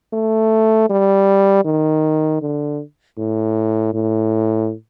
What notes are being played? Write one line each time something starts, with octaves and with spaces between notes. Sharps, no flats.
A3
G3
D#3
D3
A2
A2